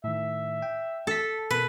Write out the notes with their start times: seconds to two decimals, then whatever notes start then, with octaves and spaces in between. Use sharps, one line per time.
0.04 A2 D#3 E5
0.62 G5
1.07 A4 A5 B6
1.51 B2 B4